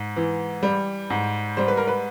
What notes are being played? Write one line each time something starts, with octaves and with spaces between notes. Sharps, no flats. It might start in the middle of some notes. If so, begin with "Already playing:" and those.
Already playing: G#2
E3
G3
G#2
G3 C5
B4
A#4
B4